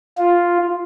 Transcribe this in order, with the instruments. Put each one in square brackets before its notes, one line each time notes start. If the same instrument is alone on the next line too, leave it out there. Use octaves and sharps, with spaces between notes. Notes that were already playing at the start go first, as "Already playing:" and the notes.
[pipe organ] F4